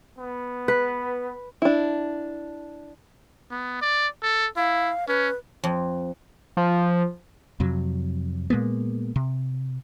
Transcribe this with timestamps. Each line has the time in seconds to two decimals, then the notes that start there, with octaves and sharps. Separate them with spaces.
0.19 B3
0.68 B4
1.62 D4 E4
3.50 B3
3.81 D5
4.22 A4
4.56 E4 F5
5.08 C#4 B4
5.64 F2
6.57 F3
7.60 F2 C3 F#3
8.50 A#2 G#3 A#3 B3
9.16 C3